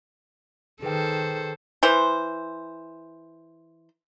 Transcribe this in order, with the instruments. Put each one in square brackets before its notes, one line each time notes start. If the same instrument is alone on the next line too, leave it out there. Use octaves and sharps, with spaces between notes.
[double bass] D#3 [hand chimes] G#4 B4 G5 [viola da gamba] A4 C5
[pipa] E3 C5